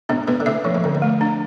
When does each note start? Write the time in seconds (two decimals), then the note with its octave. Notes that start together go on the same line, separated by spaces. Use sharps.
0.09 G#2 B2 D4
0.28 G#2 B2 B4
0.40 D3
0.46 A2 C3 E5
0.64 A2 F3
0.75 G#2
0.84 F2 D3
0.95 G#2
1.02 A3
1.21 D4